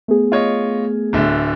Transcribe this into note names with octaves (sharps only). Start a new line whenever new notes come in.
A3 B3 G#4
F4 C#5 D#5
D1 D3 E5